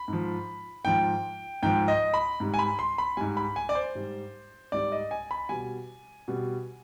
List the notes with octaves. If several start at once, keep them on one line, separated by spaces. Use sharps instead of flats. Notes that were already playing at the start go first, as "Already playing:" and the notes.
Already playing: B5
G#2 F3
G#2 F3 G5
G#2 F3 G5
D#5
B5
G#2 G3
G#5
B5
C6
B5
G#2 G3 G#5
B5
G#5
D5
C5
G#2 G3
G#2 G3 D5
D#5
G#5
B5
B2 G3 G#5
B2 G3